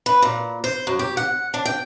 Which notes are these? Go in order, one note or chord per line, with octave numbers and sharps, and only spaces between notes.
B4
A#2
C5
F#2
G4
F#5
D4
G5